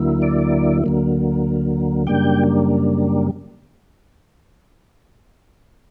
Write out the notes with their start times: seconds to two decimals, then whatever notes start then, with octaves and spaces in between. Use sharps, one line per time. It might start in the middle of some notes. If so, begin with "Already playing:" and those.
Already playing: D2 D3 F#3 A#3 E4
0.22 D5
0.84 D2 D3 F#3 A#3
2.07 F#2 C#3 G3 A#3 D4 G5